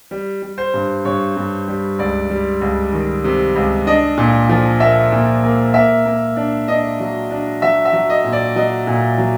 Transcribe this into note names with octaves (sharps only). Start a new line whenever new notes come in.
G3
G3
C5
G2
G2 C#5
G2
G3
C#2 D5
G3
C#2
D#3
C3
C#2
D4 D#5
A#2
F3
A#3 E5
A#2
A#3
A#3 E5
A#3
D4
D4 D#5
F#3
D4
F#3 E5
E5
F#3
D#5
A#2
D5
F#3 D#5
A#2
F#3